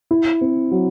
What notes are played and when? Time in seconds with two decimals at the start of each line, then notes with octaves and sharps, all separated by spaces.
0.11 E4
0.41 C4
0.71 F#3